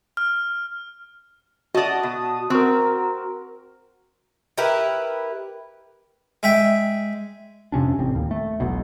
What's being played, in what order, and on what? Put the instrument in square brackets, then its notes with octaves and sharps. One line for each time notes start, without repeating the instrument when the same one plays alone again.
[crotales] F6
[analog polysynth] F#4 A5 D#6 [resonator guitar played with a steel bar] D5 D#5
[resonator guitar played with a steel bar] B2
[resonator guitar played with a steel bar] C4 [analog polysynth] F#4 A#4
[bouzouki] E4 G4 A#4 B4
[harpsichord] G#3 E5 G5
[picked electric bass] F2 C3 C#4 D4
A1 C4
D#2
A3
E1 B1 B2